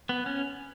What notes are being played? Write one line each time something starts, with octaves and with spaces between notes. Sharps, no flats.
B3
C#4